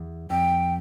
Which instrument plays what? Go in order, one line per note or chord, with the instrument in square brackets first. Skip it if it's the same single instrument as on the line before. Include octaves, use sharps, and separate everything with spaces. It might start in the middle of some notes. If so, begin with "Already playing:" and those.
Already playing: [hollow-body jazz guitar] E2
[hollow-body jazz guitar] F2 [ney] G5